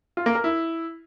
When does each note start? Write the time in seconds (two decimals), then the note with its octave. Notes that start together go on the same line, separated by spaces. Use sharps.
0.17 F4
0.26 A#3
0.35 A#4
0.44 E4